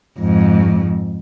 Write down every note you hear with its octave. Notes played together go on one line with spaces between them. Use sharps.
F2 G#2